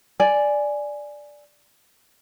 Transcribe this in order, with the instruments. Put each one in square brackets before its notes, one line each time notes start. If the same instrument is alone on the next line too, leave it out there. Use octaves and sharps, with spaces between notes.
[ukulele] D5 G#5